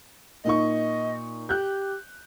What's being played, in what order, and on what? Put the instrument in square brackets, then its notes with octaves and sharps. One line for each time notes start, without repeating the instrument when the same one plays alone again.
[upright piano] A#2 D#4 C#6 [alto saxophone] D#5
[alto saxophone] G4 [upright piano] F#6 G6